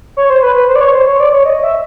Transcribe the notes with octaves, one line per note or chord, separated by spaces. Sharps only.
C#5
C5
B4
B4
C5
D5
C#5
C5
C#5
D5
C#5
D#5
E5